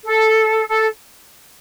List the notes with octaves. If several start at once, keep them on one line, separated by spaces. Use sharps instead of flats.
A4
A4